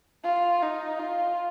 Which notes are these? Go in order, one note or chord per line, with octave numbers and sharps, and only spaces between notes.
F4
D#4
F4